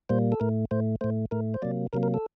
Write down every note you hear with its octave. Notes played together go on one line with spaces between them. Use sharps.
A#2 G3 A#3 C5
A4
A2 A3 A#4
A2 A3 C5
A2 A3 C5
A2 A3 A#4
C5
C3 F#3 A#3 D5
C3 F#3 A#3 A#4
A#4
A4